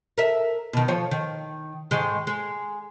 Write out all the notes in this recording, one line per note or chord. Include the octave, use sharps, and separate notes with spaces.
A#4 E5
B2 D#3
F3 C#5
D#3
G#2 D#3 G#3
G#3